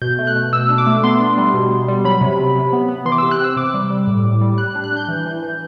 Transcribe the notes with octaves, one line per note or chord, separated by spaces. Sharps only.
B2 G6
A3
F#6
B2
B2 E6
D4
D6
A3
B3 C6
D4
G3
B2
B3
G3
F#3 B5
C3
F#3
C3
B3
B3
E3 C6
D6
C3 E6
F#6
C4 E6
C3 D6
G3
G3
A2
A2
G3
G3 F#6
F#6
D4
F#6
D4 G6
E3
E3
E3